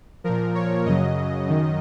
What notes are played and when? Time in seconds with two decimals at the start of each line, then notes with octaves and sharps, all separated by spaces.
0.24 A#2 F3 A#4
0.55 C#5
0.86 F#2 C#3 F#3 D#5
1.47 F#2 D#3